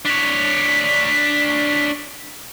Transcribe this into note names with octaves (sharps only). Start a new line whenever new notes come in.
D4 C#5 B6